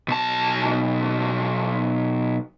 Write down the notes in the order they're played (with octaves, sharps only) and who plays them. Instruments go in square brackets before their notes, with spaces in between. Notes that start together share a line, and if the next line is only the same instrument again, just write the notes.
[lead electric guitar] B1 A5